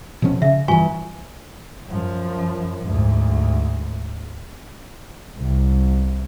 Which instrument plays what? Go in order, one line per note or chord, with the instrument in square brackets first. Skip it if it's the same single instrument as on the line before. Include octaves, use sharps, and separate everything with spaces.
[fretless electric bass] B2 F3 C#4
[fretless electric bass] C#3 [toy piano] E5
[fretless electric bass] G2 E3 [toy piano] F4 G#5 C#6
[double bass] F#2 F3
D2 G#2
[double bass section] C2